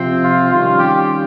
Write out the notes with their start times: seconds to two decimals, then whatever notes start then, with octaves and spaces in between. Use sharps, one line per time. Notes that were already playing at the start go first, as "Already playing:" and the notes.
Already playing: C3 F3 C4
0.24 F4
0.52 D#3 G3 C#4 F4
0.79 G4